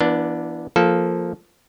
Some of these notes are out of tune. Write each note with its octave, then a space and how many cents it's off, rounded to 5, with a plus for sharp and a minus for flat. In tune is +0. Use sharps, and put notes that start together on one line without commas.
E3 +20 B3 -30 D4 +0
F3 +0 A#3 +0 A4 -15